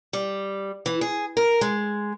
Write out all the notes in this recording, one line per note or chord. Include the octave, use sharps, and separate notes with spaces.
G3
E3
G#4
A#4
G#3